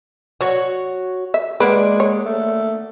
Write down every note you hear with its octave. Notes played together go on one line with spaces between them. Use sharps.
F#3 F#4 C#5
E5
G#3 A#3 D4 B4 F#5
C#5
A3